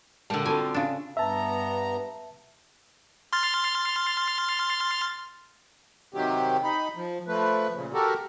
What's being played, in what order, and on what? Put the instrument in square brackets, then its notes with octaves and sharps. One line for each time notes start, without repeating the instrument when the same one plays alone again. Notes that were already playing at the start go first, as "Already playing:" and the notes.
[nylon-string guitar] A#2 G#3 A5 [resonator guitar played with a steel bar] D3 G3 [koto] F5
[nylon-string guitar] C4 F4 F#4 [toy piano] A4 A5 B5 [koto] G#5
[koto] C#3 D4
[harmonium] G2 B3 A#5 [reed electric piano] E5 A5
[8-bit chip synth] C6 F6 A6
[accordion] C3 D#3 F#3 G4
D#4 B5
F3
F3 A3 B4
A#2 C#3
F#4 G4 A4 A#4